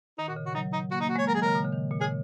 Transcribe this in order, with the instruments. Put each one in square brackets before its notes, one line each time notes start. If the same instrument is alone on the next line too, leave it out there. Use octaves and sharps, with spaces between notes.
[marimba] D#3 [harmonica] D#4
[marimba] A#2 [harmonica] F#4
[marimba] C#3
[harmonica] F#4
[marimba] F#3 [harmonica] D#4
[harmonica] D#4
[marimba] A#3 [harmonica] F#4
[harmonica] D#4
[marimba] A#3 [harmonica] F#4
[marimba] G#3 [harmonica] C#5
[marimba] F#3 [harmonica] A#4
[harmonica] G#4
[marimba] D#3
[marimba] C#3 [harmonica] A#4
[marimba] A#2
C#3
D#3
A#2
[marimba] C#3 [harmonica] G#4